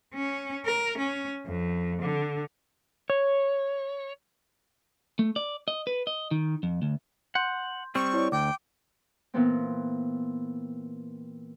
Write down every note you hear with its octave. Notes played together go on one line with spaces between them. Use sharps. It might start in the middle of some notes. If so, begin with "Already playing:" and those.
C#4
A#4
C#4
F2
D3
C#5
A3
D5
D#5
B4
D#5
D#3
F2
D2
F#5 C6 G6
G3 C4 C#6
E4 C#5 D5
D2 G5 D6
A#2 E3 B3 C4